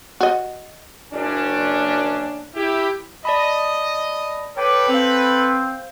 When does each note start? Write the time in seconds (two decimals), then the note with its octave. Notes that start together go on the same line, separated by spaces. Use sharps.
0.21 F#4 D#5
1.13 F#1 C#4 D4
2.55 E4 G4
3.25 D5 D#5 A5 B5
4.57 A4 B4 C#5 G5 D6
4.90 C4 C5 F5